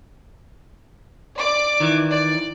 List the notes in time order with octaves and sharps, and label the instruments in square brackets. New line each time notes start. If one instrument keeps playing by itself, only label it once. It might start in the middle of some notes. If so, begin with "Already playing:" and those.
[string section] D5 D6
[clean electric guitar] D#3 E3
[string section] D5